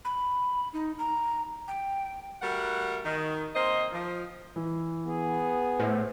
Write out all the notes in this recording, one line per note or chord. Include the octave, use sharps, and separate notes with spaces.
B5
D#4
A#5
G5
G3 A3 F#4 A#4 F#5
D#3
A#3 C4 C5 D#5
F3
E3
B3 G#4
A2 C5